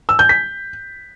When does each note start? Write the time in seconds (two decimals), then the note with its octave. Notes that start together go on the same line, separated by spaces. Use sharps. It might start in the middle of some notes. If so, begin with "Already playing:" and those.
0.09 E6
0.19 G6
0.29 B6